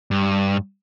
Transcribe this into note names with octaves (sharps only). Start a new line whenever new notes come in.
G2